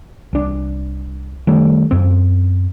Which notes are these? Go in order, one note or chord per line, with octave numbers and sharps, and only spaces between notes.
C2 D4
D#3 G3 A3
F#2 C4